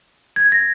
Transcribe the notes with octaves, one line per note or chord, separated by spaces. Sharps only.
G#6
A#6